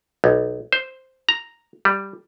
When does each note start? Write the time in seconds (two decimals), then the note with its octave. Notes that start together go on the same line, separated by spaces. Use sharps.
0.24 B1
0.73 C5
1.29 A#5
1.85 G3